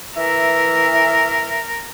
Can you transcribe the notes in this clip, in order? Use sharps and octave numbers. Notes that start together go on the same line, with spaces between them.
E3 A#4 E5